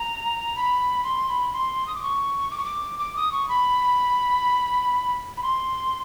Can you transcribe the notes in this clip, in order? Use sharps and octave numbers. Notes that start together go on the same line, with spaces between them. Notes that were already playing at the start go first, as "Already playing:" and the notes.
Already playing: A#5
B5
C6
B5
C6
D#6
D6
C#6
D6
C#6
D6
D6
D#6
C#6
B5
B5
C6